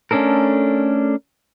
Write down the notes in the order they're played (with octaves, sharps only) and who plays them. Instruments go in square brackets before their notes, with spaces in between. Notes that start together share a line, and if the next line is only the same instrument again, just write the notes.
[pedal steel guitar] A3 C#4 D4 A4 A#4